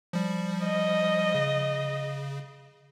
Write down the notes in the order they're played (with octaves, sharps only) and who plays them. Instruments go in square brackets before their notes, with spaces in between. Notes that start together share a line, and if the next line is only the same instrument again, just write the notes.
[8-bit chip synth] F3 G3
[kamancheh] D#5
[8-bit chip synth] C#3